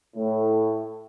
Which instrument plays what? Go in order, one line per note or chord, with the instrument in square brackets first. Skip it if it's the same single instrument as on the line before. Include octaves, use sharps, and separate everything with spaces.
[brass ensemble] A2